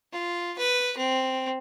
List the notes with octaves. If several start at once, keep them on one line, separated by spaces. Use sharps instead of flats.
F4
B4
C4